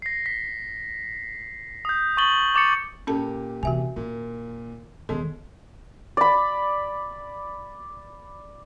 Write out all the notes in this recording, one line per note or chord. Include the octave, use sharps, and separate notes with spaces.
A#6 C7
B6
D#6 G6
C#6 D#6 A6 F#7 G7
C#6 D6 A6 C#7
A#2 C#4 G4 A4 A5
C3 E3 F#4 E5 G#5
A#2 D#3
E1 D#3 G#3 B3 A4
D5 B5